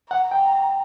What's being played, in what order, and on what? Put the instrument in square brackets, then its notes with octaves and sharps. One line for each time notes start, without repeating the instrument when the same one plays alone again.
[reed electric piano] F#5 [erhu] A#5
[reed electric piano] G5